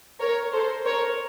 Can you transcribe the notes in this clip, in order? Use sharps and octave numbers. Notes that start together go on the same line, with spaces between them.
A#4 C#5
A4 C5
A#4 C#5